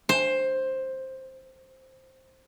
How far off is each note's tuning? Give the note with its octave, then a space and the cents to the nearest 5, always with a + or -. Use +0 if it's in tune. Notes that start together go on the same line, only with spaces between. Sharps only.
C5 +10